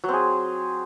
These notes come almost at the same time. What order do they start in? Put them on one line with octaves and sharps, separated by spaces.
F#3 C4 G#4